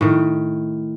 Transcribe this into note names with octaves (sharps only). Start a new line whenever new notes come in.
A2 D#3